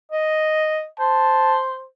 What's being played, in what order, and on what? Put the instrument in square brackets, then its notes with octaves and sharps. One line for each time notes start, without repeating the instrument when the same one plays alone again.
[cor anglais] D#5
[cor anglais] C5 [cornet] A5